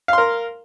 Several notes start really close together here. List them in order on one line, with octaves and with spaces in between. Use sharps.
F5 C6 A#4